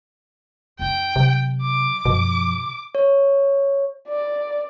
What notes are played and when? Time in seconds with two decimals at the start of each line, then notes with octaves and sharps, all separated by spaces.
0.79 F2 D#4 G5
1.16 C3 F#3
1.62 D6
2.05 F#2 B2 F3
2.95 C#5
4.08 D5